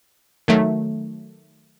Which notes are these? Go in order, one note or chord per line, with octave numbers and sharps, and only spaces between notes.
D#3 F#3 A3